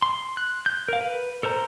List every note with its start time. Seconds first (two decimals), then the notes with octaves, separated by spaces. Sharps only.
0.02 C6
0.37 F#6
0.66 G6
0.88 A#4 F5
1.01 B4
1.43 A4 A#4 C5 A#5